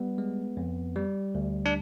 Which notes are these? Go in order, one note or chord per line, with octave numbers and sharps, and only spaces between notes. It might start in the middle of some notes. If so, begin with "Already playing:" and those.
Already playing: G3 B3
G#3
F2
G3
D2
D4